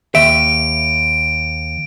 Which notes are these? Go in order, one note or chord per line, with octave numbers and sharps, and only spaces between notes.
D#2 E5 D7